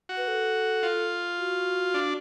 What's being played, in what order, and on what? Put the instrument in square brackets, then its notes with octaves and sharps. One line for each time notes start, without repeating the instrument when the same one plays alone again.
[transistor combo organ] F#4
[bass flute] B4
A4
[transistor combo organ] F4
[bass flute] F#4
[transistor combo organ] D4